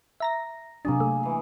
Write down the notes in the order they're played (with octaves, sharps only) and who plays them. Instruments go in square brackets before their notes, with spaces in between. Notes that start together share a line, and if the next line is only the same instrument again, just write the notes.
[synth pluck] E5 A#5 A#6
[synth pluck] C3 F#3 D4 [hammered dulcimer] A#3 G#4
[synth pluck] A3
[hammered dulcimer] E3 G#4